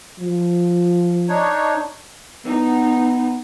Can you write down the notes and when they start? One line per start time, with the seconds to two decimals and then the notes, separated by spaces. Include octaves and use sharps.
0.19 F3
1.29 D4 D#4 C#5
2.45 B3 D#4